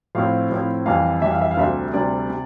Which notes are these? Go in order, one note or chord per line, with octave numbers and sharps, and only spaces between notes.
A2 F3 C4 E4 F5
A2 F3 C4 E4
F2 E3 G3 F5
F2 E3 G3 E5
F5
E5
F5
D2 C3 G3 E5
D2 C3 G3 D5
C3